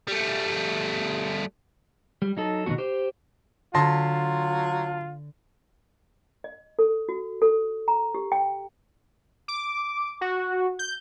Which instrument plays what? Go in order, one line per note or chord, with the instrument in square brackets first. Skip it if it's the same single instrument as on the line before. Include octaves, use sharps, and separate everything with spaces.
[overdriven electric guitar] G3 A3
[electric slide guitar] G3
F#3 D#4 A4
B2 D#3 E3 B3 F#4
G4 C5
[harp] D3 B6 [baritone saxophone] F#3 [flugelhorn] F4 [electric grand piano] A5 C6 A#6
[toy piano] D#5
A4
F#4
A4
A#5
G4
G5
[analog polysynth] D6
F#4
G6